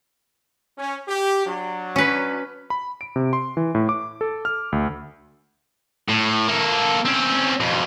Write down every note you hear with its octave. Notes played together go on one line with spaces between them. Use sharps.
C#4
G4
F#3 D4
C#4 B4
B5
D7
C3
C6
E3
A2
D6
A4
F6
D2
A2
A#3 A4
C4 C#4
F2 B2